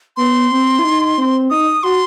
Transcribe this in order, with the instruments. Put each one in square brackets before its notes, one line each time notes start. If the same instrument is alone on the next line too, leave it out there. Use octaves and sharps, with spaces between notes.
[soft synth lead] B3 [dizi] C6
[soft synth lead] C4
E4
D#4
C4
[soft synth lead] D#4 [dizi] D#6
[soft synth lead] F#4 [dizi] C6